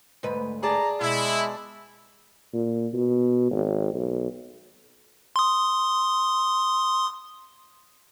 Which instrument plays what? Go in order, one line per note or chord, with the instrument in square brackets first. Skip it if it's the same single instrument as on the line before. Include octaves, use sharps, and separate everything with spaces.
[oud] D2 G#2 B4
[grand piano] G#4 D5 A5 [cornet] A#5
[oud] B2 [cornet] G#3 [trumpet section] E4
[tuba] A#2
B2
G#1
B1
[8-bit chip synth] C6 D#6